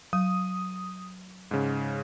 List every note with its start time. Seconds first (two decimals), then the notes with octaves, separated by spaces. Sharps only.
0.13 F#3 D#6
1.51 G#2 C#3